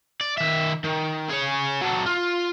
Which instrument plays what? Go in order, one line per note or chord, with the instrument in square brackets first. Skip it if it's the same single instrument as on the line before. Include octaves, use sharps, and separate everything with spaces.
[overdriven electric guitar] D5
D#3 E5
D#3
G#4 C#5
F#3 A4
F4